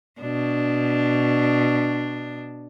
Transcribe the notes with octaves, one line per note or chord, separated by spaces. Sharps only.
B2 D4